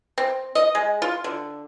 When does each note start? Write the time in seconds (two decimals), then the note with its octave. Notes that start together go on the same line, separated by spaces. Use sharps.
0.18 C4
0.55 D#5
0.75 G#3
1.02 F4
1.24 D3